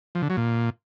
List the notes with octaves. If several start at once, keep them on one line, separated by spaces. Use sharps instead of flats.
F3
D3
F#3
A#2